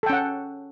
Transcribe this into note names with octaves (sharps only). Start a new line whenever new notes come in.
C#4 A4 F#5 G5